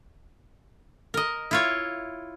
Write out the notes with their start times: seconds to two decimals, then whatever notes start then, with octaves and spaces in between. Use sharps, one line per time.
1.14 A#4 D#5
1.51 E4 F4 C#5